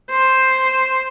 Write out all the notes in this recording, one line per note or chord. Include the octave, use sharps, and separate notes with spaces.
C5